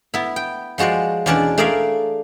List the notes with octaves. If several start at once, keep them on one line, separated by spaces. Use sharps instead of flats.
B3 E4
G5
F3 G#3 F#4 C5 D5
E2 B2 C#4 D4 D5 A5
A3 G#4 A#4 D5 E5 F5